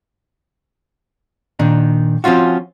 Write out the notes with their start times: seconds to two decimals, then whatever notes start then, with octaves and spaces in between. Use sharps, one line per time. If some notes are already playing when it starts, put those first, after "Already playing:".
1.59 A#2 D#3 D4 D#4
2.24 F3 C4 C#4 F4 F#4